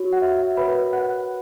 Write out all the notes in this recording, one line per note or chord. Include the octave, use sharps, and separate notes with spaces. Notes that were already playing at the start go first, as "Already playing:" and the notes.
Already playing: F#4 C#5
F#5
E5
E5
F#4 A#4 B4 C#5 B5
F#5 F#6